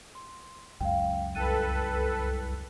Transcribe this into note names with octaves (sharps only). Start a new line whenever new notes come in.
C6
C#2 F#2 F5 G5
C2 A4 B4 G5 F#6 D#7